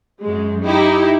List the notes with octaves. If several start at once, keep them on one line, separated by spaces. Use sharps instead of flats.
F#2 G#3
D#4 E4 G4